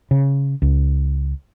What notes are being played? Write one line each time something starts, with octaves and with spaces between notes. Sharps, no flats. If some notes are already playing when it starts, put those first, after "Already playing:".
C#3
C#2